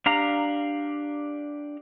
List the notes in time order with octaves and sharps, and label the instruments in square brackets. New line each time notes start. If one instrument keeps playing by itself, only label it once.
[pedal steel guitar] D4 G4 F5 A#5